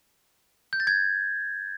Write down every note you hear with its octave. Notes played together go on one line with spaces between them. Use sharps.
G6
A6
G#6